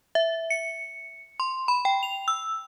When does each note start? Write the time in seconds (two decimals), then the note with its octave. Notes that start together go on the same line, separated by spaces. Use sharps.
0.15 E5
0.50 C#7
1.40 C6
1.68 B5
1.85 G5
2.03 F7
2.28 E6